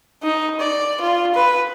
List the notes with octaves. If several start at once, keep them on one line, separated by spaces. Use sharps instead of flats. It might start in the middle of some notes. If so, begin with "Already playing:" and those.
D#4
D5
F4
B4